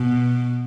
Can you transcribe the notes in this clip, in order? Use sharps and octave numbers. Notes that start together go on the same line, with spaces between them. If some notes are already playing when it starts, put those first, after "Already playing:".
Already playing: B2